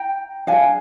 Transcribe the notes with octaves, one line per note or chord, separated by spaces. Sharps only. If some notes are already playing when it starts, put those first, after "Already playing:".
Already playing: G5 A#5
D4 G#4 F5 G#5